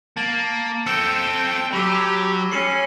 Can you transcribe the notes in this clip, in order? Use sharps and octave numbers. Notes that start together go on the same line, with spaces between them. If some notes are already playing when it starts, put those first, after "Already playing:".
A#3 A5 A6 F#7
C4 A4 G5 E6 C#7
F#3 G4 B5 E6
C#4 C7 C#7 D#7